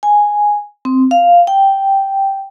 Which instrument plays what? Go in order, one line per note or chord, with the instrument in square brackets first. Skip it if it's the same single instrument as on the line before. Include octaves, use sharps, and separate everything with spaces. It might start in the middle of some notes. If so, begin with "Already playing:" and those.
[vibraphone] G#5
C4
F5
G5